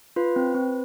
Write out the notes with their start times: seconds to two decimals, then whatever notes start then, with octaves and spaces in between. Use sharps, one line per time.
0.16 F4 B4
0.36 C4
0.54 C4